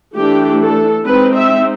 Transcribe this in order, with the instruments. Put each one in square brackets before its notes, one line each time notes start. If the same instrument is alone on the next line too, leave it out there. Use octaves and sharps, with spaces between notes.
[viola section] E3 A3 D4 G4
A4
G#3 C4 D#4 B4
E5